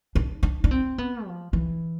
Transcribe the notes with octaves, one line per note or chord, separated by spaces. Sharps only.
D4
D4
D4
C4
B3
F3
E3